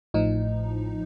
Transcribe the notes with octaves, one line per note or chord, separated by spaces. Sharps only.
A1 A2 F3 D#4